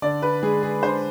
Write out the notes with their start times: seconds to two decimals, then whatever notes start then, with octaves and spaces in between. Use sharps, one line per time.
0.02 D3 D5
0.22 B4
0.43 G#3 G#4
0.63 G#4
0.82 D3 C5